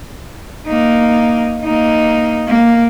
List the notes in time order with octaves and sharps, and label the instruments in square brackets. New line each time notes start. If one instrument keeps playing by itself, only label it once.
[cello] A#3 D#4
A#3 D#4
A#3